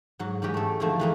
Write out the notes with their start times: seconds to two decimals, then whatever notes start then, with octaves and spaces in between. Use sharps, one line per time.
0.19 G#2 F#3
0.42 G#2 E3 C#4 G4 D#5
0.54 A3 A4
0.80 E2 D3 D#3 F3 A3
1.00 E3 G#3 A#3